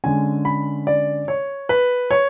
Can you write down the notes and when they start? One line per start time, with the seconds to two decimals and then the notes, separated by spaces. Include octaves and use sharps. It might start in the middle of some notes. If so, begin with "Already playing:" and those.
0.04 D3 G#3 C#4 G#5
0.45 B5
0.87 D5
1.28 C#5
1.69 B4
2.11 C#5